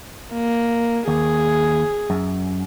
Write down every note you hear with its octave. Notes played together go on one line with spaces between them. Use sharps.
A#3
D#2 G#4
F#2